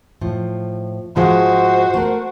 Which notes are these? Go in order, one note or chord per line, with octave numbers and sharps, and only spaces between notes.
A2 F3
G#2 F3 G#3 F#4 C5
A3 A#4